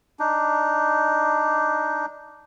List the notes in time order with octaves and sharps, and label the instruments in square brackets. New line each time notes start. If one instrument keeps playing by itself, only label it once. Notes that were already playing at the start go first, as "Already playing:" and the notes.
[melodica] D4 D#4